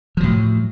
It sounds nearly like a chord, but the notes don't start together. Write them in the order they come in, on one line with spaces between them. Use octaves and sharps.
F3 F#3 A2